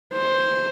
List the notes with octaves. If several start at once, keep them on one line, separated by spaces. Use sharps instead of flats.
C5